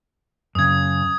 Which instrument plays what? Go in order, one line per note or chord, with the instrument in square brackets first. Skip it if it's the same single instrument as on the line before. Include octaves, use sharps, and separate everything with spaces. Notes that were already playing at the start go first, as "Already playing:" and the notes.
[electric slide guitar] F#2 C#3 [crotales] D#6 G#6